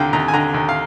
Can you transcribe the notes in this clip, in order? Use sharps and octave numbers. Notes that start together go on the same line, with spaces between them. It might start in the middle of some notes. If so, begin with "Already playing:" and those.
Already playing: D#2 D3 F5 G5 A#5
D#2 A#5
G#5
D3 A#5
D#2
F5